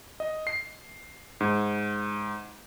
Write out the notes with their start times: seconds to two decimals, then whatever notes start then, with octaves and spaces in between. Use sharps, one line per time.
0.20 D#5
0.47 C7
1.41 G#2